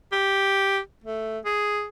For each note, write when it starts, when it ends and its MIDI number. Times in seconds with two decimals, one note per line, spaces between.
0.12 0.79 67
1.04 1.39 57
1.45 1.86 68